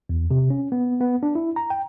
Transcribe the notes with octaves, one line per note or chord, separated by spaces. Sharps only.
E2
C3
C#4
B3
B3
D4
E4
A#5
G5